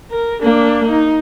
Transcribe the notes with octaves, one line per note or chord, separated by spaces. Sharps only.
A#4
A#3 D4
D#4